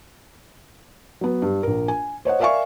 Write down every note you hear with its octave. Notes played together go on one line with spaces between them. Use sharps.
F#3 B3
G2
A#1 A#4
G#5
C5 C#5 D#5 F#5
A#4 D5 E5 F5 G#5 C#6